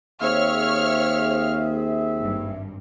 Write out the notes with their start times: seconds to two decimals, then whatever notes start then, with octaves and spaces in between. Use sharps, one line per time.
0.21 D#2 C4 G#4 C#5 E5 F5 F6
2.18 G#1 G2